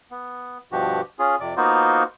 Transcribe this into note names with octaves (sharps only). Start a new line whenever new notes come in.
B3
G2 B2 F3 F#4 G4
C#4 F4 G#4
F2 C3 D5
A#3 B3 D#4 F4 F#4 C5